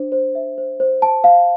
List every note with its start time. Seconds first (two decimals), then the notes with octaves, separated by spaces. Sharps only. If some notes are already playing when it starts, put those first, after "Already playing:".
Already playing: D4 C5
0.12 C5
0.35 E5
0.58 C5
0.80 C5
1.02 A5
1.24 F5